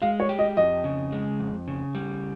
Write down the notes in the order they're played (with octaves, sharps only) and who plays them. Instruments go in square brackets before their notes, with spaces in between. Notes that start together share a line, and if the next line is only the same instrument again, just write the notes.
[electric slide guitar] G#3 [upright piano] F5
[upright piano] C#5
[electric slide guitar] G4
[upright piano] D#5
[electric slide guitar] F2 [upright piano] D#5
[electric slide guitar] C#3
G#3
F2
C#3
G3